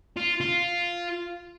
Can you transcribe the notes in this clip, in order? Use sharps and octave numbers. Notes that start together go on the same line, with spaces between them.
F4
F4